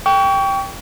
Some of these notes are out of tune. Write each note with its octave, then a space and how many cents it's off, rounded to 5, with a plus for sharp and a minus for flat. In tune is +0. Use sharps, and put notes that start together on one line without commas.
G5 +0 C#6 +35